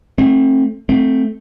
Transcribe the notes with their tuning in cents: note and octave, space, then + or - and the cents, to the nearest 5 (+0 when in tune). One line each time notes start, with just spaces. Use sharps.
A3 +5 C4 +30
A3 +0 C4 +0